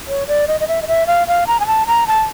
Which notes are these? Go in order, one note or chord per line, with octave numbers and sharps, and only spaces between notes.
C#5
D5
D#5
D#5
E5
D#5
E5
F5
F5
A#5
G#5
A5
A#5
A5